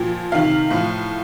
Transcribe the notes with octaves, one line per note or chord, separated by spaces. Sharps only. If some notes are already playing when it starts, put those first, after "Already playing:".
Already playing: A#2 F3 G5
C3 D#3 F5
A2 F3